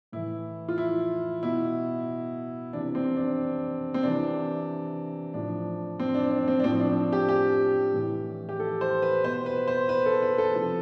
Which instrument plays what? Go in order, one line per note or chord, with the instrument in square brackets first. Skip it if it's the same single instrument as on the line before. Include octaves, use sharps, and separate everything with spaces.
[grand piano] A2 E3 E4
F4
E4
B2 E4
C3 E3 D4
C4
D4
C4
C3 E3 D4
A2 F3 D4
C4
D4
D4
C4
D4
A2 F3 C4
D4
G4
G4
A2 E3
G4
A4
C5
B4
B2 C5
B4
C5
B4
A4
B4
A4
C3 F3 A4